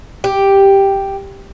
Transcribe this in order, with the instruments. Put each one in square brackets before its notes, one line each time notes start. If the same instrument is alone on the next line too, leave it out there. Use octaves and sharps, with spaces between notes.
[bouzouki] G4